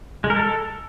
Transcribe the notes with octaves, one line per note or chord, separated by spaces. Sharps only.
G#3
A#4
A4